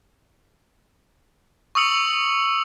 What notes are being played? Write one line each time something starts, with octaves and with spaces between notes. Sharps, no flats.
C#6 D#6 E6 C#7 F#7